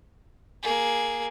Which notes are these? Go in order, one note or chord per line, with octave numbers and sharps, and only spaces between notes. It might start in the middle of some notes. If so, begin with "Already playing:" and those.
A#3 G#4